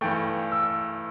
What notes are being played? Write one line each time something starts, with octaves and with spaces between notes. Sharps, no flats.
G2 E3 A3 G5
E6